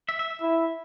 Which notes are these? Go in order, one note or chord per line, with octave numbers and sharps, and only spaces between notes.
E5
E5
E5
E4